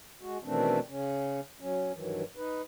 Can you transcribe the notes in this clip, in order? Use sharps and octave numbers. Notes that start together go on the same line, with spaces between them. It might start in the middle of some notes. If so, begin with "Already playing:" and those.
G#3 F#4
B2 D#3 E3 A3 C4 D4
C#3 C#4
F#3 C#4
G2 D#3 E3 F#3
D#4 B4